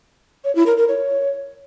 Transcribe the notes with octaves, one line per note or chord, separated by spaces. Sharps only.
C#5
E4
A#4
A#4
C#5